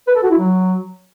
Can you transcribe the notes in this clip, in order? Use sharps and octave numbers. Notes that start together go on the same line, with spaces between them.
B4
A4
F#4
E4
F#3